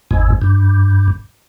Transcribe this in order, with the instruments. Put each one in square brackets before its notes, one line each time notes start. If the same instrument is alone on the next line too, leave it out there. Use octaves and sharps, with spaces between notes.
[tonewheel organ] G#1 E2 G#2
G2